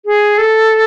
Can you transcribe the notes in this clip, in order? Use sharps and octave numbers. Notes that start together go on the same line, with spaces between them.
G#4
A4